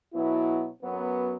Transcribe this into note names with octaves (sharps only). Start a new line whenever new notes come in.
B2 F#3 B3 E4
F#2 F#3 B3